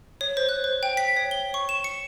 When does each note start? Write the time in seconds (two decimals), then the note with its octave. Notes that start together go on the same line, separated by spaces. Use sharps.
0.21 C#5
0.37 C5
0.49 F#6
0.64 C5
0.83 G5
0.97 B6
1.16 C#5
1.31 G7
1.54 C#6
1.69 E7
1.84 C#7